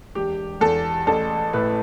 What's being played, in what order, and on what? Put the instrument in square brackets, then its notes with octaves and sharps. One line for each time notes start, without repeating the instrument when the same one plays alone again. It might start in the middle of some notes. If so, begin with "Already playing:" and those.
[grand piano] E1 G4
E2 A4
A1 A4
A2 B4